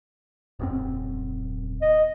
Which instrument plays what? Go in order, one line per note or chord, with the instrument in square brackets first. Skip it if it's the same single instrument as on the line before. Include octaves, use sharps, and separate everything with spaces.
[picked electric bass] D#1 F#2 C4
[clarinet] D#5